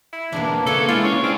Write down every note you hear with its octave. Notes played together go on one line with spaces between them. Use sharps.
E4
B1 E2 A#3 D4 G#4 B4
C#3 F#4 A4 C#5 E5
G#3 E4 F4 D5
C#4 C#5
C4 D4 B4